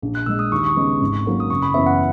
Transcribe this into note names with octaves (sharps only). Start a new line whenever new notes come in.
A#1
F#6
A#2 G#3 E6
D#6
D#2 C#6
D#6
C#6
C#3 G#3 B3
G#1
G#2 F#3 A#3
D#6
F#1 C#6
B5
F#2 E3 B3 E5
F#5